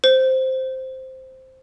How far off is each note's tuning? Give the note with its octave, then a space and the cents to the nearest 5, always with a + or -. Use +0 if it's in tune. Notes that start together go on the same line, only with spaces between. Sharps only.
C5 +0